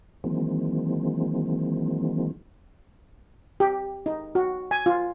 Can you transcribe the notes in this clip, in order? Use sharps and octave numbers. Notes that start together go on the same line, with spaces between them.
D#3 E3 F#3 G#3 A#3 C4
G4
D#4
F#4
G#5
F4